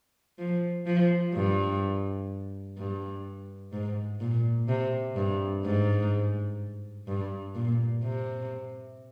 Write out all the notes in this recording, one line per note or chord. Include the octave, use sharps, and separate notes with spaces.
F3
F3
G2
G2
G#2
A#2
C3
G2
G#2
G2
A#2
C3